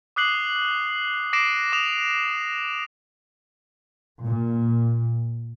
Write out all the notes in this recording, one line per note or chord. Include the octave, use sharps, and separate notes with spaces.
D6 D#6 F#6 C7 F#7
D6 A#6 C7 D7 E7
D6 D#6 E7 F7
A#2